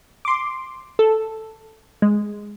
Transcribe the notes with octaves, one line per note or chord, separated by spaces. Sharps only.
C6 D6
A4
G#3